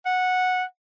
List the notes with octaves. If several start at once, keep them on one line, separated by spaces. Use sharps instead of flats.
F#5